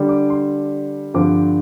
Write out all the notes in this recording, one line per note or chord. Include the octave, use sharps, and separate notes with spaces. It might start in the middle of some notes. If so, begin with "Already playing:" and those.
Already playing: D3 G3 D4
D6
C6
G2 D3 F3 C4 D6